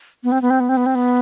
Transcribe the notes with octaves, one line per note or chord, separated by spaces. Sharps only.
B3
C4
B3
C4
B3
C4
B3
C4
B3